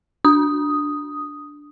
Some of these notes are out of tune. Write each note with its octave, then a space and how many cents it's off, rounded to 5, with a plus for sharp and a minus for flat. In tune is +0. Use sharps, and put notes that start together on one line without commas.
D4 +0 D#6 +0